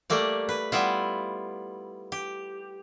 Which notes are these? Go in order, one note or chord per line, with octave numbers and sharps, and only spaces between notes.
G3 A3 A#3 D5
B4
G3 B3 E4 F4
G4